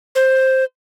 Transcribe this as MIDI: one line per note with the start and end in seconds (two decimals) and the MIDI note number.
0.15 0.64 72